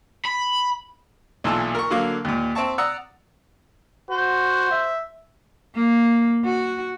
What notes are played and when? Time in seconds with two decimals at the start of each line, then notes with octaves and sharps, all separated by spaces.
0.25 B5
1.44 B1 A#2 E3 E4 F4 A5
1.75 A#4 C#6
1.90 D3 F#3 A#3 F5 D6
2.25 D#2 A#2
2.55 C4 E5 A5 C#6
2.78 D5 F#5 A#5 D#6 E6
4.10 F#4 C5
4.71 E5
5.76 A#3
6.45 F#4